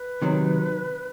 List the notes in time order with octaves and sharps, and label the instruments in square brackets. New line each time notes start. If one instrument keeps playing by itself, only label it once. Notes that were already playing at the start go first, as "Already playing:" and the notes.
Already playing: [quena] B4
[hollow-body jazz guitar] C3 D#3 F#3